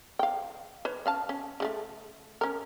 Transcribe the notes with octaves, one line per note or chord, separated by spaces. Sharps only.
F5 G5
B4 C#5
C#4 F5 A5
C#4
C#3 G#3 A3
C#4 A#4